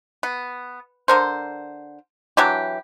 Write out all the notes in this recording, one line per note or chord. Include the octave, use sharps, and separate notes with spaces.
B3
D3 A#4 C5
E3 F#3 D4 G4